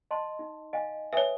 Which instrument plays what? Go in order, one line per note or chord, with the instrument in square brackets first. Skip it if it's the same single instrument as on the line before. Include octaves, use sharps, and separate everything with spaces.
[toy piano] D#5 A5 C6
D#4
D#5 F5 G#5
[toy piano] B4 G#5 D#6 [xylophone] C#5 E5